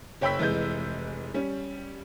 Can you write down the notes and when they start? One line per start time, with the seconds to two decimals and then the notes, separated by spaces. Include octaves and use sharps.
0.21 F#1 C#5 G5 B5 E6 B6
0.39 F1 E3 G#3 G6
1.34 G3 C#4